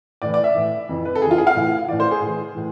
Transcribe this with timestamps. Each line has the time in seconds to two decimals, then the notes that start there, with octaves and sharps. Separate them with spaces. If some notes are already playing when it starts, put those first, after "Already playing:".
0.22 A2 E3 D5
0.34 D5
0.44 E5
0.55 A2 E3
0.89 F2 E3
1.05 B4
1.15 A4
1.22 F2 E3 G#4
1.31 F4
1.38 G#4
1.47 F5
1.55 A2 E3
1.88 E3 D5
1.92 A2
2.00 C5
2.11 G#4
2.21 A2
2.27 E3
2.55 A2 E3